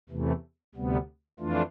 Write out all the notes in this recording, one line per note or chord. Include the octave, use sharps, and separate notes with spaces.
E2 C3 E3 A3
D2 C3 G3 B3
F2 E3 A3 D4 F4